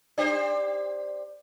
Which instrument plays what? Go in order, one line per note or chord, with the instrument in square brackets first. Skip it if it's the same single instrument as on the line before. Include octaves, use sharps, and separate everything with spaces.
[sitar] D4 G4 C5